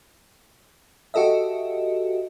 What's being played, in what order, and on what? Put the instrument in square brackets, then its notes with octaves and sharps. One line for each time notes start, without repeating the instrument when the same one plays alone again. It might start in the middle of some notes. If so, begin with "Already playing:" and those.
[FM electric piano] F#4 G4 A4 D#5 E5